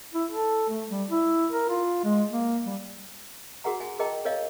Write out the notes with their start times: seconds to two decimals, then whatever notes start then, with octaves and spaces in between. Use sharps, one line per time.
0.14 E4
0.31 A4
0.69 A3
0.89 G3
1.10 E4
1.52 A#4
1.69 F4
2.04 G#3
2.31 A#3
2.66 G3
3.64 F#4 G#4 A#4 F#5 A#5
3.80 G#5
3.99 G#4 A#4 D#5 G5 A5 A#5
4.25 A#4 C#5 D#5 F5